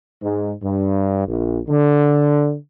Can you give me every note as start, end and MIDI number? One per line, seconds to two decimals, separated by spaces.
0.22 0.52 44
0.63 1.25 43
1.28 1.59 34
1.68 2.55 50